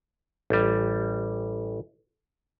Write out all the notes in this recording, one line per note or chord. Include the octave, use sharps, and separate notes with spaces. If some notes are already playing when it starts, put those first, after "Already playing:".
A1 G3